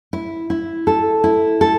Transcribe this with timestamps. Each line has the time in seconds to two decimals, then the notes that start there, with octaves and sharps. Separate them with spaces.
0.13 E4
0.50 E4
0.87 A4
1.24 E4
1.61 A4